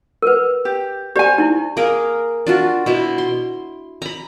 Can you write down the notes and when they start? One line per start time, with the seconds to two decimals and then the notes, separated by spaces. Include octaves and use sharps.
0.22 A#4 B4
0.65 G4
1.16 G4 C5 D5 G#5
1.38 D#4 E4
1.77 A#3 G#4 A#4
2.47 D4 F4 F#4
2.86 B2 E4
3.18 C6
4.02 A#5 B5